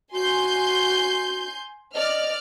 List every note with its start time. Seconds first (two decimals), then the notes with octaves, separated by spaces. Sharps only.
0.13 F#4 G#5 C6 G6
1.95 D5 D#5 F6